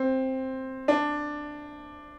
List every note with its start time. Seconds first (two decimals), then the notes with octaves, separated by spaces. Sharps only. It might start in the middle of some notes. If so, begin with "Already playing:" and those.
Already playing: C4
0.88 D4